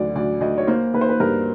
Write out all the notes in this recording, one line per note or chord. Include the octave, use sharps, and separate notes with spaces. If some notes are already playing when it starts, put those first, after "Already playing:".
Already playing: D2 D3 F#3 D5
D2 D5
D2 D#5
C#5
A#3 C5
A#3 B4
C5
B4
G2 A#4